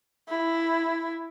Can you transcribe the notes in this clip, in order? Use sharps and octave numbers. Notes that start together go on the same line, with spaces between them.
E4